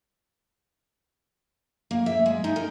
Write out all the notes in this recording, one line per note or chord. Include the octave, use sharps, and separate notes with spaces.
A#3
E5
G#3
D#4
A#4